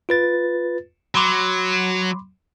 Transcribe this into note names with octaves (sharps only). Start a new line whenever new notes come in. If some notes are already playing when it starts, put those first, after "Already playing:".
F4 B4 A6
F#3 B5 C6 D6